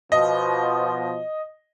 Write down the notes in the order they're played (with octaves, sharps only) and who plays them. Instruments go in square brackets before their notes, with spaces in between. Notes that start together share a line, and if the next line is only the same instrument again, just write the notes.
[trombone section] B2 F3 [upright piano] D#5